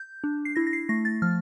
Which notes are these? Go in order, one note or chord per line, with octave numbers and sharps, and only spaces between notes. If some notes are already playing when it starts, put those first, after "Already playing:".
Already playing: G6
D4
C7
E4 A#6
A#6
C7
A3 A#6
A6
F3 F6